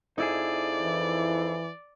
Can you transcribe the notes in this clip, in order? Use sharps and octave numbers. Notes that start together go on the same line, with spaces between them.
F2 D#4 E4 G#4 D5
E3